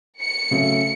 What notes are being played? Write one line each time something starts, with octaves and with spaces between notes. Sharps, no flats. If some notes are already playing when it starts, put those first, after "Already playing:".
C#7
C#3 F#3 A3